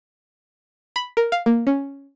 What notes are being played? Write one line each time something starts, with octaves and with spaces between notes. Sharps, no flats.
B5
A#4
F5
A#3
C#4